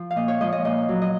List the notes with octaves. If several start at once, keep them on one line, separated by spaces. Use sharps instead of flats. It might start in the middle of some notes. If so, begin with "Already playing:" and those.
Already playing: F3
F5
A#2 D#5
C#5
F3 G#3 D#5
D#5
A#2 D#5
F#3
D#5